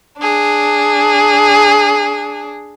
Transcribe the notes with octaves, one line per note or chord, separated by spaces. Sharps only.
D4 G#4